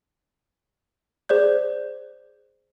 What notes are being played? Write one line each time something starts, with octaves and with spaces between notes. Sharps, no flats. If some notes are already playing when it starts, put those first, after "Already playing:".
G#4 C5 D5 G6